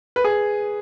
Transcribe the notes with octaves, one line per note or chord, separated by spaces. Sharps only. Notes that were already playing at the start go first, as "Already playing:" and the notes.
B4
G#4